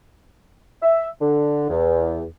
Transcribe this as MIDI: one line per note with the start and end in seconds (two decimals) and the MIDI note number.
0.83 1.08 76
1.21 1.67 50
1.70 2.23 40